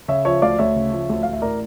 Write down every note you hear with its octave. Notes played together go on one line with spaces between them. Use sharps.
C#3 C#5 E5
F3 C#5 E5
D2 D5 F5
D2 C#5 E5
C#3
F3
D2
A1 F5
E5
A2 A#4 D5